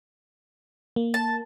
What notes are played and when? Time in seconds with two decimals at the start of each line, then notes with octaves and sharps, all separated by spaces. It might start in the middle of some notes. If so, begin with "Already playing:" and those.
0.96 A#3
1.14 A5